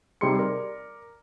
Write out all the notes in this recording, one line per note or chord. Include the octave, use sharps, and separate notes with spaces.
C3 G3 D#4 G#4 C6 C#7
A#4 D5